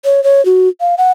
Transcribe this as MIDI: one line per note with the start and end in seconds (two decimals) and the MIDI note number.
0.05 0.23 73
0.24 0.44 73
0.45 0.69 66
0.81 0.95 77
0.98 1.12 78